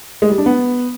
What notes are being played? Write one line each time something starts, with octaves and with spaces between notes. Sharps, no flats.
G#3
G3
D4
B3